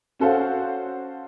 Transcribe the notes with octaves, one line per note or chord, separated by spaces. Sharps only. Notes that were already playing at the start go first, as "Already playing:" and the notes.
C#4 F#4 A4 C5 F5 F#5